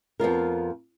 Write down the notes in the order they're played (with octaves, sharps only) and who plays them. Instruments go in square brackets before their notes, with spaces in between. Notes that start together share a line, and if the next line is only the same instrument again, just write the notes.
[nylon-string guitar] F2 B3 F4 A#4